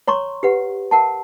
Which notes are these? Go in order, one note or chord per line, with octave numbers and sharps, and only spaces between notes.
C#5 A#5 C6 C#6
G4 B4 F#5
A#4 F#5 A5